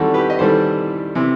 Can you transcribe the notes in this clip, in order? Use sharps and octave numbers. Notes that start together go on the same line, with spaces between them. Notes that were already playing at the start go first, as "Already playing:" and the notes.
Already playing: E2 D#3 G3 C4 F#4 A4
G4 B4
D#5
E2 D#3 G3 A4 C5
C3 E3